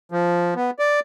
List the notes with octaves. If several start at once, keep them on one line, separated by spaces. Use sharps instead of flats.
F3
B3
D5